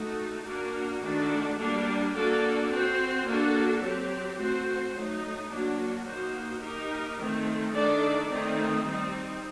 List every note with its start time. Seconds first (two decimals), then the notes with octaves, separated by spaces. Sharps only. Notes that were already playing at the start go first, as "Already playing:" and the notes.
Already playing: A3 D#4 F#4 A4
0.46 A#3 D4 F#4 A#4
1.02 D#3 A3 D4 F#4 A4
1.58 G3 A#3 D4
2.14 A#3 D4 F#4 A4 D5
2.69 C4 F#4 C5
3.25 A#3 D4 F#4 A4
3.81 F#3 C4 G4
4.37 A3 C4 F#4 C5
4.93 F#3 A3 D#4
5.49 F#3 A#3 D4 F#4
6.05 A#3 D#4 F#4 C5
6.61 A#3 D#4 G4 A#4
7.17 D#3 A3 C4
7.73 D#3 A3 D4 A4 D5
8.29 D#3 A3 C4 D#4
8.85 G3 C4 D#4